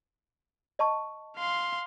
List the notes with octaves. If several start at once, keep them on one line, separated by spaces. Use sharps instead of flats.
D#5 A5 C#6
F5 C6